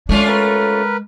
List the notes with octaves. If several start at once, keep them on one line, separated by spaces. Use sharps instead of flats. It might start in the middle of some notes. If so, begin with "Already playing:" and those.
G#3 A3 C#4 D4 F4
A#4 B4